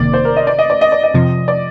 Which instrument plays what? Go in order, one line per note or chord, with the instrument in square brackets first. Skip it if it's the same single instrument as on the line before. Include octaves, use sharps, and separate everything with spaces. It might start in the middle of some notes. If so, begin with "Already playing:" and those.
Already playing: [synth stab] G1 F2 C3 D#3 A#3 [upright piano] D5
[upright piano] C5
A#4
D#5
D5
D#5
D5
D#5
D5
D#5
[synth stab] F2 C3 F3
[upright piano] D5